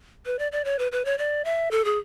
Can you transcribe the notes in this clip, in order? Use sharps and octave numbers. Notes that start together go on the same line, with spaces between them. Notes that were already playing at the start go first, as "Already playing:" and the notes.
B4
D5
D5
C#5
B4
B4
C#5
D5
E5
A4
G#4